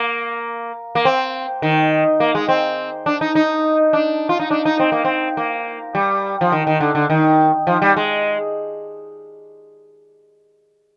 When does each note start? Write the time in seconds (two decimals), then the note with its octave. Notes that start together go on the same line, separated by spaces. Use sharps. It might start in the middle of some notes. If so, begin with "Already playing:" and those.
Already playing: A#3
0.95 A#3
1.05 C4
1.62 D#3
2.20 A#3
2.35 G#3
2.49 C4
3.06 D4
3.21 D#4
3.35 D#4
3.93 D4
4.29 F4
4.40 D#4
4.51 D4
4.65 D#4
4.80 C4
4.92 A#3
5.05 C4
5.37 A#3
5.95 G3
6.41 F3
6.52 D#3
6.67 D#3
6.80 D3
6.95 D3
7.10 D#3
7.67 F3
7.82 G3
7.97 G#3